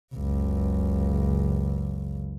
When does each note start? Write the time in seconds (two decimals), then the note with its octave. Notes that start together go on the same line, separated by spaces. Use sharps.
0.15 F#1 C#2